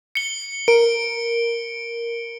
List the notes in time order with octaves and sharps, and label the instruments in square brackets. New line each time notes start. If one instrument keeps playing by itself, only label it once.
[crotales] C#7 G7
[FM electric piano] A#4 [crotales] D7